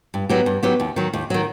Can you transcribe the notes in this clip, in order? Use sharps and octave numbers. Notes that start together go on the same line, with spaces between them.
G2
F#3 B3 D#4 G4
G2
F#3 B3 D#4 G4
D#2
D#3 F#3
D#2
D#3 F#3